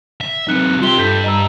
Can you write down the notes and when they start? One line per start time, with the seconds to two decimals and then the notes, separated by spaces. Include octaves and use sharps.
0.21 E5
0.48 C3 F#3 D#4 F#6 C#7
0.81 C4 F4 G4 C6 G7
0.98 G2 A4 G6 B6
1.24 D#5 A#5 E6